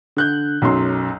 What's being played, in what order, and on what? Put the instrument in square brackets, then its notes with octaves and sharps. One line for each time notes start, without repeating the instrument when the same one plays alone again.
[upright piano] D3 F#6 G6
B1 F#2 F#3 C6